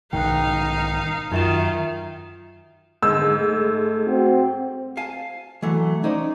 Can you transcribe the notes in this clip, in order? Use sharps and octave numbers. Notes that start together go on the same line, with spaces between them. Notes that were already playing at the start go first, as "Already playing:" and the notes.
B1 G#2 D#3 D#4 F5 G5 F#6
F#2 D#3 D#4 F4 E5 E7
G#2 D3 E6
A3
C4 F#4
F5 G#5 A5
E3 F#3 A3
C#4 D#4 C5 D5